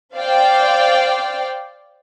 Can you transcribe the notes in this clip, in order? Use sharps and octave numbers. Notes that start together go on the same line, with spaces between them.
C5 D5 F5 G5